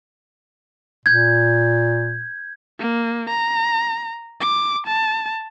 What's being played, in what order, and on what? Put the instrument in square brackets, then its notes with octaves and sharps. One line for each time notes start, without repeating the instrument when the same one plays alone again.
[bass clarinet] A#2 [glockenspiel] G6 G#6
[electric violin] A#3
A#5
D6
A5